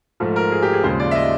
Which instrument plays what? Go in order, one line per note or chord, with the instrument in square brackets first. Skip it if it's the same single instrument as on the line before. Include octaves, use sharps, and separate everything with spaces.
[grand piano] G#2 F3 A3
A#4
G#4
G4
G#4
D#2 C#3 F3 G#3 C5
D5
E5
D#5